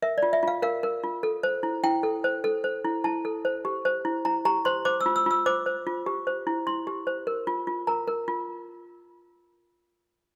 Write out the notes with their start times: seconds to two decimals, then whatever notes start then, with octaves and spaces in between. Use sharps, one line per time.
0.02 A#4 E5
0.18 F4 D5
0.33 E5
0.43 F4 F5
0.62 A#4 F5
0.83 A#4
1.03 F4
1.23 A4
1.43 C5
1.63 E4
1.83 E4 G5
2.03 A4
2.24 C5
2.44 A4
2.64 C5
2.85 E4
3.04 E4 A5
3.25 A4
3.45 C5
3.65 G4
3.85 C5
4.05 E4
4.25 E4 A#5
4.45 G4 A#5
4.65 C5 C6
4.85 C5 D6
5.01 E6
5.06 F4
5.16 E6
5.26 F4 E6
5.46 C5 D6
5.66 C5
5.87 F4
6.06 G4
6.27 C5
6.47 E4
6.67 E4 C6
6.87 G4
7.07 C5
7.27 A#4
7.47 F4
7.67 F4
7.87 A#4 A#5
8.07 A#4
8.28 F4